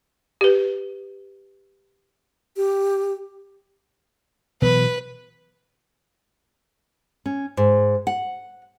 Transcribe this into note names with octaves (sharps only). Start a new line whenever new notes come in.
G4 B4
G4
B2 E3 F#3 B4
C#4
G#2
F#5